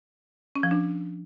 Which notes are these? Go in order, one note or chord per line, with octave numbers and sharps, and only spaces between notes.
C#4
F3
D4